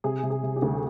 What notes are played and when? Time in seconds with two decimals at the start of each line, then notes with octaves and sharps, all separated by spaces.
0.04 C3 G#4
0.23 C3
0.30 G#4
0.43 C3
0.56 G4
0.62 D2